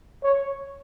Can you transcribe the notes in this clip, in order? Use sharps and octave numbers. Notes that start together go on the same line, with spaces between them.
C#5